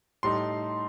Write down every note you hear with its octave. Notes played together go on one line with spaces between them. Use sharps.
A2 G3 D#4 C6